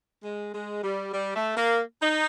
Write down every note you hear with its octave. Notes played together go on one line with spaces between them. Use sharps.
G#3
G#3
G3
G3
A3
A#3
D#4